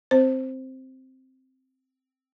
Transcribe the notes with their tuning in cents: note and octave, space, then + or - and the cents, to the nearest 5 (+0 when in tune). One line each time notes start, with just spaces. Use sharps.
C4 +0 C5 +5